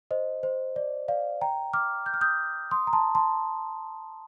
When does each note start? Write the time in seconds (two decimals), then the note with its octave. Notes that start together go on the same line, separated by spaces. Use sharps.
0.11 C5 D#5
0.43 C5
0.76 D5
1.08 D5 F5
1.41 G5 A#5
1.73 D6 F6
2.06 G6
2.14 F6
2.21 D#6 G6
2.71 C6 D#6
2.87 A#5
2.93 A5 C6
3.15 A5 C6